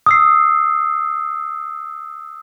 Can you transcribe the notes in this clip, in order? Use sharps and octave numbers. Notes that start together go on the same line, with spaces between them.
D#6 E6 C7